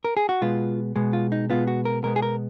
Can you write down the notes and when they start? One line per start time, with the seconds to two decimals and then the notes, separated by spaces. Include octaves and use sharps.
0.05 A#4
0.17 G#4
0.29 F#4
0.42 B2 G#3 B3 F4
0.96 B2 G#3 B3
1.13 F4
1.32 D#4
1.50 B2 G#3 B3 F4
1.67 F#4
1.85 A#4
2.04 B2 G#3 B3 A#4
2.16 G#4
2.22 A#4